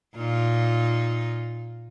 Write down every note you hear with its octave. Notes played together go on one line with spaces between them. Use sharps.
A#2 D#4 F4